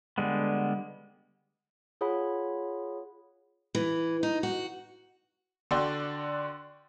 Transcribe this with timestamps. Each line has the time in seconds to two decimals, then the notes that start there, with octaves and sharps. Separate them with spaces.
0.18 D3 G3 G#3 B3
2.01 F4 G#4 C#5 F#5 B5
3.75 E3
4.23 D#4
4.43 F#4
5.71 D3 F#4 D5 G5 C6